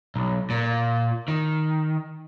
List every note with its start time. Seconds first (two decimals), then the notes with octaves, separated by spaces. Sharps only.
0.16 B1
0.50 A#2
1.28 D#3